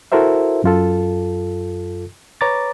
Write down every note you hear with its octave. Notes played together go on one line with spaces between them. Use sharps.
E4 F#4 A4 A#4 C5 E5
F#2 F4 A4
B4 C#5 A#5 D6 A6